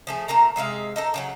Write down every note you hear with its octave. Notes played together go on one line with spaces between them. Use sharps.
F3 A3 G#4
A#2 A3 A#3 A#5
C3 G#3 E5 F5
D#4 A4 A#4
C#3 E3 F#3